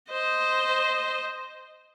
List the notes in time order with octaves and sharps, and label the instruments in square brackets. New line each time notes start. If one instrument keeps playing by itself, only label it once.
[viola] C5 D#5